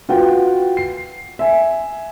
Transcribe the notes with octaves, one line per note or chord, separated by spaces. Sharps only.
F4 F#4 B4 F#5 G5
C7
E5 G#5